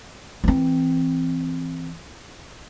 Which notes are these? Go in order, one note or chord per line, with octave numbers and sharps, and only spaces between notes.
E3 C4